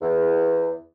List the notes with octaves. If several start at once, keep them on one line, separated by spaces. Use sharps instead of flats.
E2